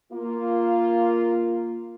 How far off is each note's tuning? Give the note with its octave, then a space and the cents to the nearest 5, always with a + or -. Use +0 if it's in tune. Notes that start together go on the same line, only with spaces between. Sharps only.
A#3 +0 F4 -5